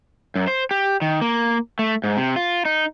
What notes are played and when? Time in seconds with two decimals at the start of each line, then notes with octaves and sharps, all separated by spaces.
0.35 F#2
0.48 C5
0.71 G4
1.02 D#3
1.21 A#3
1.79 A3
2.04 G#2
2.17 C3
2.36 F4
2.65 D#4